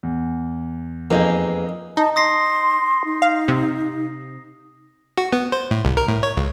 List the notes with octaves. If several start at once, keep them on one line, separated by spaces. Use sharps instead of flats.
E2
F2 A#3 D#4 G#4 B4 D#5
D#4 A5
C6 D#6 A#6 C7
D#4
F5
C3
F#4
B3
C5
A2
C2
A#4
A2
C#5
C#2